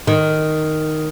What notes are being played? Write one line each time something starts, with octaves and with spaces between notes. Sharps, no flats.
D#3